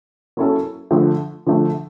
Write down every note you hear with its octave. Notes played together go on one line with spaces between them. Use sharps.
F#3 A#3 C#4 E4 A4
D3 F3 A3
D3 F3 A3